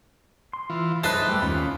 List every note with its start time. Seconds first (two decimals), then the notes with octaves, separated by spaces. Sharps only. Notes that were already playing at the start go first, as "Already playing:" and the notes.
0.53 C6
0.70 E3 F4
1.04 F#2 G#3 D#4 B4 C5 E5 A5 F#6
1.28 G3 A3
1.42 D#2 D#3 C#4 F4 B5